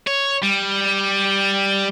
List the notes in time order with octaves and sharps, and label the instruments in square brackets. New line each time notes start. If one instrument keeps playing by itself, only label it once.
[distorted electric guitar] C#5
G3